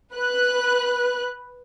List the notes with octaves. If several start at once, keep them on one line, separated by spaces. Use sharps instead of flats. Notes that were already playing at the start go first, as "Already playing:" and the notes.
B4 F#6